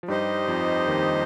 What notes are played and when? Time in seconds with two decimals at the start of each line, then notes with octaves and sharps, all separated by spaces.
0.03 F3
0.08 G2 G3 D#4 G4 C5 D#5
0.48 F2 F3
0.88 D#2 D#3